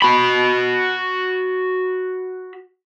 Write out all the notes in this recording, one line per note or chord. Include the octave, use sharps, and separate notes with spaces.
F#4 B5